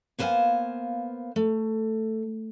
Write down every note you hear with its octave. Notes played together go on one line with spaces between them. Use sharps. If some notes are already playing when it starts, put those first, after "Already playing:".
A#3 B3 C5 D#5 F5 G#5
A3